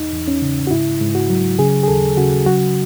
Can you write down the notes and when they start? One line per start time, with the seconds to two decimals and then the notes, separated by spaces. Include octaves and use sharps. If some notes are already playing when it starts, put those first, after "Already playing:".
Already playing: E2 D#4
0.13 E2
0.28 C#4
0.42 C#3
0.67 F#4
0.71 G#2 E4
1.01 G#2
1.15 F#4
1.30 F#3
1.59 C#3 G#4
1.83 G#4
1.88 D#2 A4
2.17 C#3 F#4
2.46 F#3 F#4